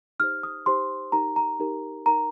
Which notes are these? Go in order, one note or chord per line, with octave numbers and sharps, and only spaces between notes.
D#4 G4 C5 F6
D#6
D#4 G4 C5 C6
D#4 G4 A#4 A#5
A#5
D#4 G4 A#4
D#4 A#4 A#5